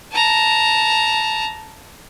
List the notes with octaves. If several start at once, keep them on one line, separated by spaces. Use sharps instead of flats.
A5 A#5